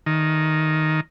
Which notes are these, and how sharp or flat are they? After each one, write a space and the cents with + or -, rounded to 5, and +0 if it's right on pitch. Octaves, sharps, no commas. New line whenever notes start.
D#3 +0